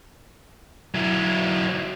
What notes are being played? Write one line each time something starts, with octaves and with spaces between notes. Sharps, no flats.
F#3 E4